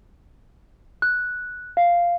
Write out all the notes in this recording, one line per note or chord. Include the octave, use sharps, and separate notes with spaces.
F#6
F5